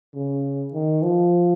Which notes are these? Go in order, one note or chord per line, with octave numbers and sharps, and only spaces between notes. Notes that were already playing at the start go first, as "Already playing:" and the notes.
C#3
D#3
F3